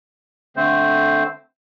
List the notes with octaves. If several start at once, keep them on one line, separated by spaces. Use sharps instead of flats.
D3 A3 C4 C5